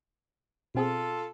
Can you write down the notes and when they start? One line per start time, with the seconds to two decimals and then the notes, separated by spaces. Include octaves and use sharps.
0.75 B2 C4 F4 G#4 A4